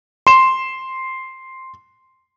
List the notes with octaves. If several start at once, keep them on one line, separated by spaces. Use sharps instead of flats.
C6 E7